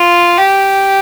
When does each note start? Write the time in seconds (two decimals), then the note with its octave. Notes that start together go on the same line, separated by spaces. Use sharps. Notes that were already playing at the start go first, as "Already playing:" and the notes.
Already playing: F4
0.38 G4